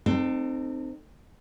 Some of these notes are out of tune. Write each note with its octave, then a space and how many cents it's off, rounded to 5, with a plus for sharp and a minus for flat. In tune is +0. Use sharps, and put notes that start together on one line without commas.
C4 +0 D#4 -25 A4 +20